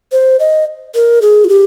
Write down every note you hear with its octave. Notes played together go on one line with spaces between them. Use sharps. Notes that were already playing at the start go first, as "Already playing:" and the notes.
C5
D#5
A#4
G#4
F4
G4